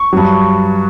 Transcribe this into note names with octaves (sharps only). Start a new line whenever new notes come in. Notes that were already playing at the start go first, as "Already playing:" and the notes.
Already playing: C#6
G2 F#3